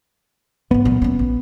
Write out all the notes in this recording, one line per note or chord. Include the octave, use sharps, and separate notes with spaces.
G#1 D#3 B3
A#2 F#3
A#3 C#4
A#1